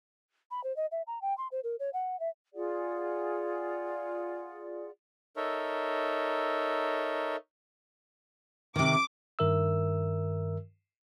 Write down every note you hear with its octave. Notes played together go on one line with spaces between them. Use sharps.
B5
C5
D#5
E5
A#5
G5
C6
C5
A#4
C#5
F#5
E5
F4 G#4 D5 F#5
D#4 A4 A#4 C#5 E5
C3 D#3 D6
G2 D#3 A#4 E5 E6